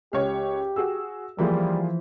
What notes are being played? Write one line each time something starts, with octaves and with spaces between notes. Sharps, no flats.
C#2 G4 C#5 F5
F#4 G#4 E6
E3 F3 G3 A#3 F4 G#4